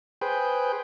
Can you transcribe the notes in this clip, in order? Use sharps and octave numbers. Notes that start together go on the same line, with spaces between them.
G#4 B4 C5 G5